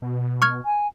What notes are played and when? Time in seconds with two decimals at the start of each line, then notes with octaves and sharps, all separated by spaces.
0.02 B2
0.42 C#6 F6 G#6
0.65 G#5